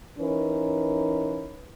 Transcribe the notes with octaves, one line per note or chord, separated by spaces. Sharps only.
E3 C#4 D#4 A#4 B4